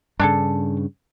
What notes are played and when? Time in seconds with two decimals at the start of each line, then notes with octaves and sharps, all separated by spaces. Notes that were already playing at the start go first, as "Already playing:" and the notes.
0.19 G2 C#3 D4 G#4 A4